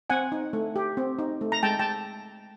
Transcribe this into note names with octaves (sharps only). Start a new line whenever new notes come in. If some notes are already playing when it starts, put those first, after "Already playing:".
C4 F#5 G#5
D#4
A3
G4
C4
D#4
A3
A#5
G#3 G5 A5
G5 A5